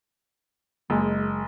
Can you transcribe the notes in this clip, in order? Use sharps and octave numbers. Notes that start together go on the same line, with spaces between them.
F#1 G#3